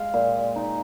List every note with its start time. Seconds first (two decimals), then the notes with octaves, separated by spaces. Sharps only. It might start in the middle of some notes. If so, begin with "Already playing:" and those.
Already playing: G#3 F5
0.14 A#2
0.56 D#4